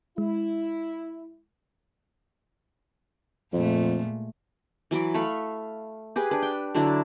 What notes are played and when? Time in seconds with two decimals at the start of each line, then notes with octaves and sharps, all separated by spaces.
0.18 G#3 E4
3.53 F2 A#2 G#3 A3
4.91 E3 F#3 B5 D6
5.14 A3 F5 B5 C#6
6.16 G4 G#4 B4
6.31 D4 B4
6.42 G5
6.75 D3 F#3 D4 E4